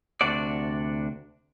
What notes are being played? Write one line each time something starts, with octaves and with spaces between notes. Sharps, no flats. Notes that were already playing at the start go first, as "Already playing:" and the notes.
D2 C3 D4 F#4 D5